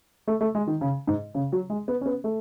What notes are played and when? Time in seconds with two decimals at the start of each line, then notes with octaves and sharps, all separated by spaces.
0.28 A3
0.41 A3
0.55 G#3
0.67 D#3
0.81 C#3
1.07 G#2
1.35 C#3
1.52 F#3
1.70 G#3
1.88 B3
2.01 C#4
2.06 B3
2.24 A3